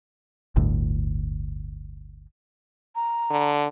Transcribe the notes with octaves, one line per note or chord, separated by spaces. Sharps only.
G1 D2 A2
A#5
D3